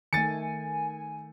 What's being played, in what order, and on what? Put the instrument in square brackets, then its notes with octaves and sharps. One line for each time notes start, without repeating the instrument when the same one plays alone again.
[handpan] D#3 A3 [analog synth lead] G#5 [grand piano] A6 C#7